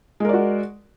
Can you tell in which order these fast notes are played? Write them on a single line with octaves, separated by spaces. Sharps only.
G#3 A#4 D5 F#4